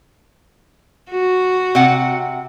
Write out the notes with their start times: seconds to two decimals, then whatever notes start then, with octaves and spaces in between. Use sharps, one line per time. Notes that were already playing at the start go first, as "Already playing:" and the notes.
1.10 F#4
1.75 C3 F#5